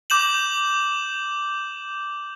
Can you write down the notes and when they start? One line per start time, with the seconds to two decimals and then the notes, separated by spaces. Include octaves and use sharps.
0.10 D6 G6 E7 F#7